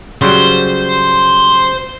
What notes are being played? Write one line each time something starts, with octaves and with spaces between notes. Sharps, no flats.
C#3 F#3 G3 C5